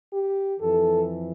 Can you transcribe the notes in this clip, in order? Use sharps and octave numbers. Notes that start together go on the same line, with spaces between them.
G4
F2 E3 A4